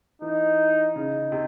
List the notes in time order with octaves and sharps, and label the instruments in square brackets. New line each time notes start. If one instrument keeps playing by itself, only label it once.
[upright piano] E3 [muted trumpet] D#4
[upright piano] C#3 [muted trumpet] D#4
[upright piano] C3